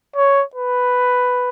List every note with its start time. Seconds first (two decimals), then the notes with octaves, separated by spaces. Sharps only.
0.16 C#5
0.55 B4